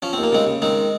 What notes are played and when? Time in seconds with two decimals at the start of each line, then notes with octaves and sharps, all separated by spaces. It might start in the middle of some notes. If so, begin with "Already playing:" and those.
0.02 F3 C#4
0.13 D#2 C4
0.23 A#3
0.32 C#3 G#3 C4
0.47 C#3
0.62 D#3 G#3 C4